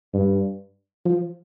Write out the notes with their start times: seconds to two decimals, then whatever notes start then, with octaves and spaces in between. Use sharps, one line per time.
0.14 G2
1.05 F3